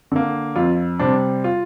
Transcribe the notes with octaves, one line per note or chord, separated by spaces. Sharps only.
D3 A#3
F2 F4
C3 G3 C4 D4
F4